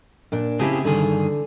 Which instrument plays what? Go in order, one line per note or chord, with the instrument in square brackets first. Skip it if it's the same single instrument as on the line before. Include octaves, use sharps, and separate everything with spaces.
[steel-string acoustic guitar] A#2 D4
[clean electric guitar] C#3 C4 G#4 [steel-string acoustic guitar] E4 G4 A5
[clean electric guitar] G2 D#3 G#4 [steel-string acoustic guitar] D3